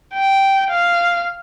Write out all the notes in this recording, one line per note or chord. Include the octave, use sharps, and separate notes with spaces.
G5
F5